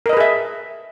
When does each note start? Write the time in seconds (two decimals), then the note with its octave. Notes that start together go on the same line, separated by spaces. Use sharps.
0.06 A#4
0.09 D#5
0.13 B4
0.17 G#4
0.20 E5